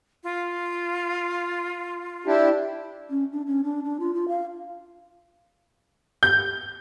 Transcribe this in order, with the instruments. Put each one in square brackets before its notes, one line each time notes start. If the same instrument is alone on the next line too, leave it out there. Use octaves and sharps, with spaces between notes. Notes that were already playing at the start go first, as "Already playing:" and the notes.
[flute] F4
[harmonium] D4 E4 G4
[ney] C#4
D4
C#4
D4
D4
F4
F4
F5
[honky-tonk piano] G6